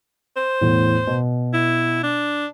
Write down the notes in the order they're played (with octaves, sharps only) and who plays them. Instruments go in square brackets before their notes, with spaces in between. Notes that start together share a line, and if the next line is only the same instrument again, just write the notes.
[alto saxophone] C5
[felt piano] E2 A2
B2
[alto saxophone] E4
D4